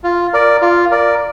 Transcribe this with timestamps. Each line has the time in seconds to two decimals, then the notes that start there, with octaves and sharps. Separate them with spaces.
0.04 F4
0.33 A#4 D5
0.62 F4
0.91 A#4 D5